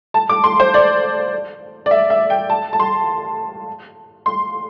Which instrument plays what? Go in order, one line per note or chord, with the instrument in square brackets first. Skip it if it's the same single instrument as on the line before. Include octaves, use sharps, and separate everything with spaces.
[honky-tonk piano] A5
D6
C6
C5
D5
D5
E5
E5
G5
A5
A5
C6
C6